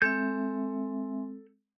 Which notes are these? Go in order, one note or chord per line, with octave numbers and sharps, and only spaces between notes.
G#3 C4 A4 E5 G6